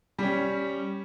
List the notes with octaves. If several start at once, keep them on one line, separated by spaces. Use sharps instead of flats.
G3 C#4